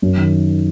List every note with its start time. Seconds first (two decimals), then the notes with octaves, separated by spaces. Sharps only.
0.02 F#2
0.17 D#3